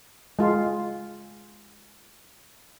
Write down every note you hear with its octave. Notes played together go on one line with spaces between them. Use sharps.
G#3 F4